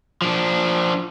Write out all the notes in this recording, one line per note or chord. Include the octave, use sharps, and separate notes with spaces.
F3 D4